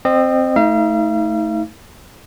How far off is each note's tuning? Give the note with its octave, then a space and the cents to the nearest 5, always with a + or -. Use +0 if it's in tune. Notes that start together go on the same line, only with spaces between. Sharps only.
C4 +0 D#5 -30
A3 -5 D#4 +35 F5 -40